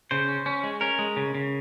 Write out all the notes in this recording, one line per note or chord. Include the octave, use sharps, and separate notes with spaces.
C#3 C5
C#4
C#4
G#3
C#4 A#4
G#3
C#3
C#3